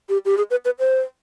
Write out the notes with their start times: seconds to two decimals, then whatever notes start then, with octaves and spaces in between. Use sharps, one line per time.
0.09 G4
0.25 G4
0.37 G#4
0.50 B4
0.65 B4
0.79 C5